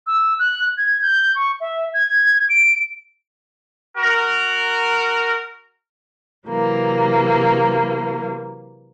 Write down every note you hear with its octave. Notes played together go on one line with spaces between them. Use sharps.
E6
F#6
G#6
G6
C#6
E5
G#6
D7
F#4 A#4
C3 E3 F#3 A#3